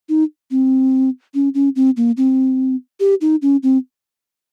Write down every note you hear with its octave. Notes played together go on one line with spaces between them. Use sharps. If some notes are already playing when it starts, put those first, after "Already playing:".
D#4
C4
C#4
C#4
C4
A#3
C4
G4
D#4
C#4
C4